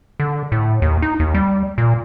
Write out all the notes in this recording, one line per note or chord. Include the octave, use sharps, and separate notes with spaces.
D3
A2
D#2
D#4
D#2
G3
A#2